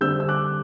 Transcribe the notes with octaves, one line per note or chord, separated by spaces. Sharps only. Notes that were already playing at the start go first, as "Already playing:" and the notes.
D3 G3 C4 E6 G6
E6
D6 F#6